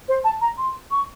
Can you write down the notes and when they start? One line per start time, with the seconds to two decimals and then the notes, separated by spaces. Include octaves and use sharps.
0.08 C5
0.24 A5
0.41 A#5
0.58 C6
0.91 C#6